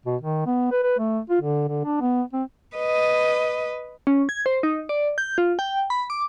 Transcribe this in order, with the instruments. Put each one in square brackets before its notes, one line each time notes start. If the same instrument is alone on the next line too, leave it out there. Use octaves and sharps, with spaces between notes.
[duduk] B2
D#3
B3
B4
B4
A3
F4
D3
D3
D4
B3
C4
[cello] B4 D#5
[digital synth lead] C#4
G#6
C5
D#4
D5
G6
F4
G5
B5
D6